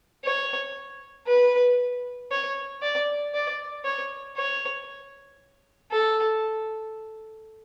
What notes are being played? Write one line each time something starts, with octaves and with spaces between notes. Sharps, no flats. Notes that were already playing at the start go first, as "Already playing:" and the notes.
C#5
B4
C#5
D5
D5
C#5
C#5
A4